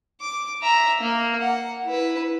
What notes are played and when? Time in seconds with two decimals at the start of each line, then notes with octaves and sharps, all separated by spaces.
0.21 D6
0.62 E5 A#5
1.00 A#3
1.39 F#5
1.85 E4 B4